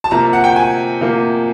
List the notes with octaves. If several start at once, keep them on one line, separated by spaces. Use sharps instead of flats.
A5
C3 F3 A#3 A#5
F#5
G5
G#5
C3 F3 A#3